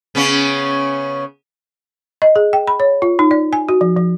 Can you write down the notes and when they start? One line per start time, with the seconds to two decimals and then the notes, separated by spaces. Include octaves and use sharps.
0.15 C#3 B3 C#4
2.22 D#5
2.36 G#4
2.53 G5
2.67 B5
2.80 C#5
3.02 F4
3.19 D#4
3.31 D5
3.53 G#5
3.69 F#4
3.81 F3
3.97 F3